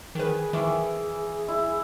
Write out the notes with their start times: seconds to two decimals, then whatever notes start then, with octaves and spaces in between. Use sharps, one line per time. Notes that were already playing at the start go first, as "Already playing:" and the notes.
0.15 D#3 G#4 B4
0.53 D#3 E3
1.48 E4